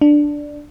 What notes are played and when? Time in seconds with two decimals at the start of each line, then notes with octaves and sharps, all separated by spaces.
0.01 D4